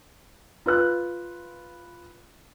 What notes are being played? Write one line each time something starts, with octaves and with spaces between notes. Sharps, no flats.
F4 B4 F#6